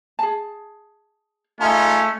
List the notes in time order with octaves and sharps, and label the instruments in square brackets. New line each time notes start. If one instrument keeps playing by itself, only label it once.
[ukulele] G#4 A5
[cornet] A3 [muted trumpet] C#4 [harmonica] D#4 F4 G#4 [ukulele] E5 A5